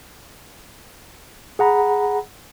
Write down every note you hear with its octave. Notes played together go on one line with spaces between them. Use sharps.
G#4 F#5 A#5 B5